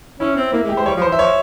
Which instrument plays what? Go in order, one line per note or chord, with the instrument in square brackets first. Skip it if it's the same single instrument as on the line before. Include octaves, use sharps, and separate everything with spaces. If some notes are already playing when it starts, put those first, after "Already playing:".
[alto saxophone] C#4 [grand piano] E4
[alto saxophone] C4
[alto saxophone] A#3 [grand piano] E4
[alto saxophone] G#3
[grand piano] G4
[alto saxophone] G#3 [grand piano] C5
[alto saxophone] G3 [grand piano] C#5
[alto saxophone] F3
[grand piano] C5
[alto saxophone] E3
[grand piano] E5
[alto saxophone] F3 [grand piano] C#5